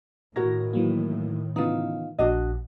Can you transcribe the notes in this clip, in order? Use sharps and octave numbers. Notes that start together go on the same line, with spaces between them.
A2 D#3 F#4 A#4 C#5 A#6
E3 F#3 A#3
C#3 E3 B3 D#4 F4
A#1 D4 F#4 D#5